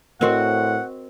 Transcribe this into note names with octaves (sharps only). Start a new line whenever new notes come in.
A2 C4 F#4 A#4 D#5 F#5 C6